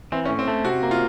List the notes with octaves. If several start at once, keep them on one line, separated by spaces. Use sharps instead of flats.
E3 C4
C#4
A2
C4
A3
C3 F#4
A#3
F4